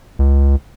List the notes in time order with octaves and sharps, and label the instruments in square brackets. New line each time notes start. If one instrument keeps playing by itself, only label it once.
[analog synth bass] C#2